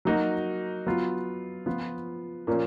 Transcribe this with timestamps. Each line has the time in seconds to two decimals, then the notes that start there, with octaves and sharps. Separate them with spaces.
0.05 F#3 A#3 D#4 F#4
0.86 F#3 B3 F4
1.66 F3 B3 F4
2.47 A#2 F3 A#3 C#4